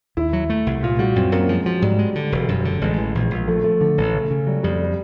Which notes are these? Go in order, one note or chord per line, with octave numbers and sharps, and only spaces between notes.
D#2 E4
F#3
A3
C2
A#2 F4
G3 F#4
F#2 C4
F#2 A#3
F3 G#3
F3 F#3
G#2 G3
G#3
D3
E1
F#2
D3
A1 G#3
E3
A#1
A#1
F3 A3
F3 A3
D3
A1
C#3
C#3
F#3 G3
F2 G3
G3